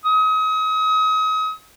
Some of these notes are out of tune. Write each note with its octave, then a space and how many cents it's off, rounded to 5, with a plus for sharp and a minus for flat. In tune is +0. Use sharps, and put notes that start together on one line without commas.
D#6 +35